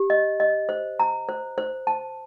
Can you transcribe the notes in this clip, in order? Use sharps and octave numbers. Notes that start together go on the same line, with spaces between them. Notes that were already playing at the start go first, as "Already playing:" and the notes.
Already playing: G4
D#5
D#5
C5
A#5
C5
C5
A5